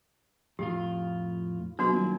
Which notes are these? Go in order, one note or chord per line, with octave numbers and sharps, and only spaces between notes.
F2 A2 F4 G4
B2 F#3 D4 F#4
D#1